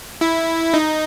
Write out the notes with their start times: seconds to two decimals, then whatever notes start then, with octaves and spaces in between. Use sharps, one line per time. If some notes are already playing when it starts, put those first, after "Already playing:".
0.21 E4
0.74 D#4